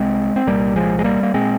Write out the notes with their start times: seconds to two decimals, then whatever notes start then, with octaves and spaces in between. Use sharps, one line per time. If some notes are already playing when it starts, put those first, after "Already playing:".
Already playing: C2 G#3 C4
0.36 C4
0.47 C2 A#2 G3 A#3
0.76 F3 G#3
0.99 G#3
1.04 G3 A#3
1.23 A#3
1.34 A#2 G#3 C4